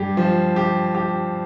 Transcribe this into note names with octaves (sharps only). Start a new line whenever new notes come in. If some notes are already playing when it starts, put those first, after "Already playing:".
Already playing: G2 G4
F3
G4
G4